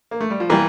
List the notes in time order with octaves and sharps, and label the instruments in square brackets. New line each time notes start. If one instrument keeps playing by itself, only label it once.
[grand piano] A#3
A3
G3
F3
[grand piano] E3 [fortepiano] G3 A#3